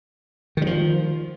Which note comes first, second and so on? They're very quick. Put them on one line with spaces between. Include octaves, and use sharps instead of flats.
D#3 G3 F3